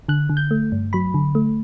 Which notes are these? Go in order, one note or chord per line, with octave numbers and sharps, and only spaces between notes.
D3 F#6
D3
G6
A3
G2
F#3 B5
D3
A3